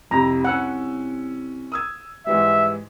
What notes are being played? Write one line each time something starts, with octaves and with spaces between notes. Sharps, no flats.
C2 F2 C3 A#5
C#4 F#5 E6 F#6
D#6 E6 G#6
G#2 E3 G3 E5